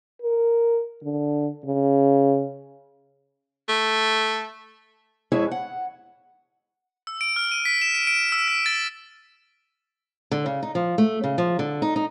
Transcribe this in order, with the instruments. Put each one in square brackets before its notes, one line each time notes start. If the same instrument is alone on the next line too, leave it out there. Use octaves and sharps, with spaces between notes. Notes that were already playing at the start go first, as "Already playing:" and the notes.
[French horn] A#4
D3
C#3
[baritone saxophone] A3
[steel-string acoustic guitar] F2 G#3 E4 G#4 C#5 E5
F#5
[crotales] E6
D7
F6
D#7
B6
E7
D7
D7
E6
B6
A6
[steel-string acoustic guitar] D3
C#3
D#4
F3
A3
C#3
F3
D3
D#4
D#4